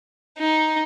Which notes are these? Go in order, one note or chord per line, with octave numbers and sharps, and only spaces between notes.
D#4